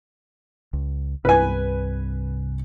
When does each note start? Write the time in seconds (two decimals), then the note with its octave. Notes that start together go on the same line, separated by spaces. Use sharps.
0.73 C#2
1.25 C2 G2 C3 B4 G#5